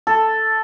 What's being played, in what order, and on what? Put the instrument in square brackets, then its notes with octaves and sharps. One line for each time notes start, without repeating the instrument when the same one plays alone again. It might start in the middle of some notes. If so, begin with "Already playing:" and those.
[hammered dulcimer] A4